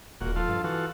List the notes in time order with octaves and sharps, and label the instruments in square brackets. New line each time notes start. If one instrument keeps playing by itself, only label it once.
[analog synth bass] D#1 [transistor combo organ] A#2 F#4
[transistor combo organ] F3 F4 A4
[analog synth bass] G2
[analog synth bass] E3 [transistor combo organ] F4 F#4 A4